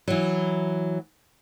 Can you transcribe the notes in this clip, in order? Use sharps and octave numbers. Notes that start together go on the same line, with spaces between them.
E3 F#3